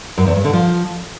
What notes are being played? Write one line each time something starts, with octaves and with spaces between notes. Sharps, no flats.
F#2
E2
G2
D3
F3